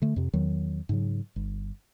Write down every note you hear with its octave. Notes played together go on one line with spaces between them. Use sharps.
D3 A3
F2 C3
E2 D#3 F#3
G#2 C#3 F#3
G1